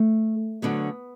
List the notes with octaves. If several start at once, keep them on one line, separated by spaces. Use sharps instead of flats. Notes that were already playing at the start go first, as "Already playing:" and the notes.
Already playing: A3
D2 D3 F#3 B3